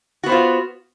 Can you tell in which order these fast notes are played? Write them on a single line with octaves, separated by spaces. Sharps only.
F#4 B3 C5 F4